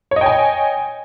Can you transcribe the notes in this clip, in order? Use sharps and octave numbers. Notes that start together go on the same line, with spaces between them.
C#5 D#5 G5 G#5